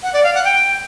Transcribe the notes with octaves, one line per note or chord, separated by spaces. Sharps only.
F#5
D5
F5
F#5
G5